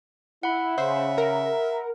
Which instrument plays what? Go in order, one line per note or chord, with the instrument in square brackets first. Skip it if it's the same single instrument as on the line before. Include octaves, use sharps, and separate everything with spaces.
[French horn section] E4 [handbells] F#5 B5
[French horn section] C#3 [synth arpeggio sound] C5 [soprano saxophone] E5
[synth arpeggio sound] A#4